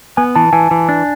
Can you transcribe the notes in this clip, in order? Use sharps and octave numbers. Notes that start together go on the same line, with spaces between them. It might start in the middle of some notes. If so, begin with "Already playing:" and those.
B3 G#5
E3 A5
E3 G#5
E3
D4